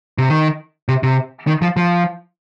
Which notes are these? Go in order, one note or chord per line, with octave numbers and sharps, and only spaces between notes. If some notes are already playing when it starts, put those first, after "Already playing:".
C3
D#3
C3
C3
D#3
F3
F3